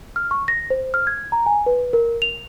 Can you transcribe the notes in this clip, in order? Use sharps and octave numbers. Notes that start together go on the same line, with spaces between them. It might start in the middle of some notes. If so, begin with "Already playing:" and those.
F6
C#6
A#6
C5
F6
G#6
A#5
G#5
B4
A#4
F7